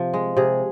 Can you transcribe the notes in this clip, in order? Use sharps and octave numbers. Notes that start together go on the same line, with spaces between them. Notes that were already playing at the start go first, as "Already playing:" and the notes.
Already playing: C3 F3
G#3
C3 G#4